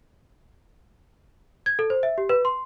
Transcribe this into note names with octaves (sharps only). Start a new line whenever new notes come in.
G#6
A4
C5
E5
G4
B4
C6